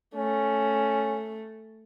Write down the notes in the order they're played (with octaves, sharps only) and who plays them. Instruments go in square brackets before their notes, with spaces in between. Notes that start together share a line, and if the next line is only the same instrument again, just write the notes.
[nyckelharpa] A3 [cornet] C#4